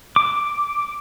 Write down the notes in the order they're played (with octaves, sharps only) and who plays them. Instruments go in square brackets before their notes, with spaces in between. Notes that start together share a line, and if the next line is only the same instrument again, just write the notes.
[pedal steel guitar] D6